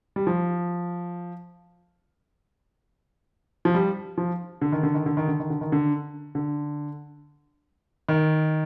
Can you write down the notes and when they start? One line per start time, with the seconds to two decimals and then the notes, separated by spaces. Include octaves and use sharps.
0.16 G3
0.27 F3
3.65 F3
3.74 G3
4.18 F3
4.61 D3
4.72 D#3
4.83 D3
4.94 D#3
5.06 D3
5.17 D#3
5.28 D3
5.40 D#3
5.50 D3
5.61 D#3
5.72 D3
6.35 D3
8.09 D#3